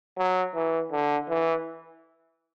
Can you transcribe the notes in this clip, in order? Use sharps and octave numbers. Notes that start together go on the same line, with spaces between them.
F#3
E3
D3
E3